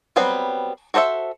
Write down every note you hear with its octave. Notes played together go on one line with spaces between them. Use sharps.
F#3 G3 B3 C4 B4
F#4 A4 C5 D5 E5